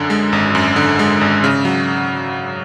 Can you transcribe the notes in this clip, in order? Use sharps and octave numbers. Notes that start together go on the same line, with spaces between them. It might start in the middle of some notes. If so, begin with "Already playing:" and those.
Already playing: F#2 D3
G#3
G#1
F#2
D3
G#3
G#1
C#3
F#3